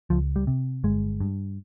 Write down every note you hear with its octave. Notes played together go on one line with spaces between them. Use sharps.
C#2 F3
G3
C3
G1 G#3
G2